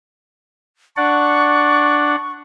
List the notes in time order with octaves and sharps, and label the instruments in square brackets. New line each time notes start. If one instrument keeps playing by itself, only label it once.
[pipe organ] D4 D5 F#5 [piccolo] C#6